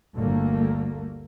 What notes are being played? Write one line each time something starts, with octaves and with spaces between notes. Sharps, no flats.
G1 D2 A3 A#3